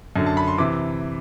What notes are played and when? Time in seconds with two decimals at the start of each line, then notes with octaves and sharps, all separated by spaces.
0.16 F#2 D3
0.26 A5
0.37 B5
0.48 C6
0.58 C3 E3 D6